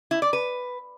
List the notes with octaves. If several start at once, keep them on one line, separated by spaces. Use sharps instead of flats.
E4
D5
B4